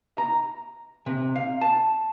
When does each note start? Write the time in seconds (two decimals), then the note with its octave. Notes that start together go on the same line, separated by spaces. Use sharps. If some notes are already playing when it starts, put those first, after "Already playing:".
0.18 A#5
1.06 C3
1.36 F5
1.61 A5